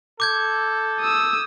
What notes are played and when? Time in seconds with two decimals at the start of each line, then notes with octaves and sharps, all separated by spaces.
0.20 A4 D6 G6 G#6
1.01 D#6 E6